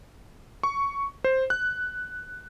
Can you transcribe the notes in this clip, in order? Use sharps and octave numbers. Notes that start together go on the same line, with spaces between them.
C#6
C5
F#6